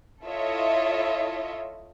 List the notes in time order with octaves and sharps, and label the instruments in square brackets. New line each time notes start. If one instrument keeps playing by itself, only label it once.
[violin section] E4 F4 A4 C#5 D#5 E5